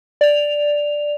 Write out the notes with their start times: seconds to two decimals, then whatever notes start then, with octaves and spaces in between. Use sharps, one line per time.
0.21 D5 F7